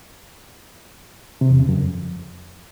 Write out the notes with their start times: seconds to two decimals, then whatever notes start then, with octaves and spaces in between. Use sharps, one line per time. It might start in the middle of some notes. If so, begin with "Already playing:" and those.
1.41 C3
1.50 E2
1.60 C#3
1.69 F#2
1.78 F2